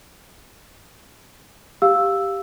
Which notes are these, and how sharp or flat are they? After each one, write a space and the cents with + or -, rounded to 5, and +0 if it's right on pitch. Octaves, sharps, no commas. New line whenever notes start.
G4 +0 F5 +0 E6 +0